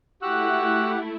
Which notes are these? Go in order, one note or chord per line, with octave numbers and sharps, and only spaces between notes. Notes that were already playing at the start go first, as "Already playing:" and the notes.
A3 E4 F#4 G4 F#5 E6 F#6